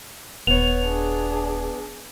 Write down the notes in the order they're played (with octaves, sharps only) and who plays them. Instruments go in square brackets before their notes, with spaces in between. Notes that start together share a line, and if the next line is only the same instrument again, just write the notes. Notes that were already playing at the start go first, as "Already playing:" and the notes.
[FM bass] D#1 [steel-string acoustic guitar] B3 C#5 [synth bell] F7
[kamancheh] D4 G#4